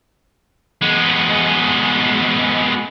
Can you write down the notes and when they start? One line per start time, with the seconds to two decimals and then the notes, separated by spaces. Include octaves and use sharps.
0.81 G#3 B3